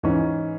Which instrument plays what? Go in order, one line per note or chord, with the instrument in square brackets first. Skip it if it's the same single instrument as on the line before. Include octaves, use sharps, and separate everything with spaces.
[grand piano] G#2 E3 C#4